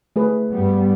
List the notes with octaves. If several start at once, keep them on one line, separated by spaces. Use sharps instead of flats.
A3 G#4 B4
G2 G3 B3